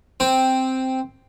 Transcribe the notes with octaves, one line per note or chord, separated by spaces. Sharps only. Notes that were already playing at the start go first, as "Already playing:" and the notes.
C4